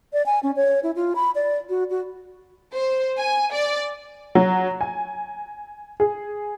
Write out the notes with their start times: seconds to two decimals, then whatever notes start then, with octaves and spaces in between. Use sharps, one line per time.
0.13 D5
0.26 G#5
0.43 C#4
0.56 C#5
0.83 E4
0.96 F4
1.16 B5
1.35 D5
1.69 F#4
1.90 F#4
2.74 C5
3.18 G#5
3.52 D5
4.35 F#3
4.81 G#5
6.00 G#4